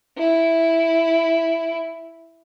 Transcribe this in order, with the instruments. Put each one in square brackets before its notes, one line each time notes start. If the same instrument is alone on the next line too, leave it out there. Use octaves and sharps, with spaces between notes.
[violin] E4